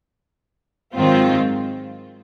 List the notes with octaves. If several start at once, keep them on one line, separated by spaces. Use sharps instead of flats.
G#2 D#3 F#3 C4 F4